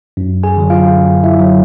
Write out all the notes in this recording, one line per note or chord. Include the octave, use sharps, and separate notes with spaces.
F#2
G#4 G#5
D3 F#3
F4 F5
F#2
E4 E5
D3 F#3